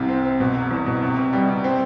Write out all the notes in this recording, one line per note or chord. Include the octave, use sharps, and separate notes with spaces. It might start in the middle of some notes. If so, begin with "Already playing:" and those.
Already playing: C2 C3
C4
C4
B2
E1
E2
B2
C3
C3
G3
C3
C4